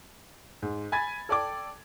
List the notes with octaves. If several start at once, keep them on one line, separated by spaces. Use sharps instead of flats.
G#2
G#5 B5 G#6 A6
A4 D5 G5 D6